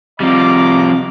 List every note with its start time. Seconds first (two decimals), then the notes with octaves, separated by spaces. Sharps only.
0.20 F3 G3 C4 D#5 A#5 D6